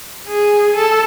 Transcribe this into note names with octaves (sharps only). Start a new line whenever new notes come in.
G#4
A4